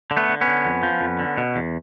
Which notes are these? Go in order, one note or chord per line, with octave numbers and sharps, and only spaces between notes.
D3
A3 B3
D3
B3 C#4
D3
F2
F3
F2
D3
B2
E2